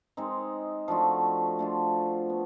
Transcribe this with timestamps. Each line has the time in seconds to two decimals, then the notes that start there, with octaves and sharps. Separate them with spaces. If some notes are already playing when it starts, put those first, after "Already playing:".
0.17 G#3 C4 D#4
0.88 F3 A3 D4 F#4
1.59 A3 D4 F4
2.30 B3